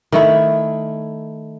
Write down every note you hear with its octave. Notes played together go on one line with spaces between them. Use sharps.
D#3 A3 E4